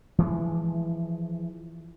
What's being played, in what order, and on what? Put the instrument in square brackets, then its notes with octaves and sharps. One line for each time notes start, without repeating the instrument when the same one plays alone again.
[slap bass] E3 F3 G#3